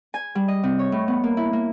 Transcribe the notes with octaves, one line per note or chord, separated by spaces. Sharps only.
G#5
G3
D#5
C3
C#5
A2
B3
A#3
E4
A#3